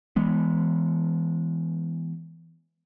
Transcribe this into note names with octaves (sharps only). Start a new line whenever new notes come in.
E3 G#3 B3